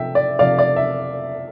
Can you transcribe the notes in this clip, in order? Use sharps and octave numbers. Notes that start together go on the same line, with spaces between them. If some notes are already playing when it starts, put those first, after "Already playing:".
Already playing: C3 F3 A3 E5 G5
D5
C3 F3 A3 D5 F5
D5
E5